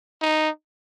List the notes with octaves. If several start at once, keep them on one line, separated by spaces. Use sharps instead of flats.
D#4